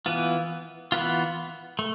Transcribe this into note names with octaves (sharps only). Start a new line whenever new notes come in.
E3 B3 F4
E3 B3 F4
A3